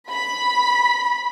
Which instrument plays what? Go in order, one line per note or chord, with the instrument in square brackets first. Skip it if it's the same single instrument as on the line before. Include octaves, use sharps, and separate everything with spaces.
[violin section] B5